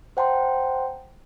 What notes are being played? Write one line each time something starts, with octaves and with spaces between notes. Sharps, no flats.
C5 F#5 G5 A5 A#5 C6